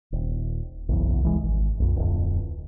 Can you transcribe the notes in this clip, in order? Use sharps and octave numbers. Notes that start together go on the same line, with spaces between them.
D#1
F#1 B1 E2
C2 E3 G#3
G#1
A#1 F2
D1 F2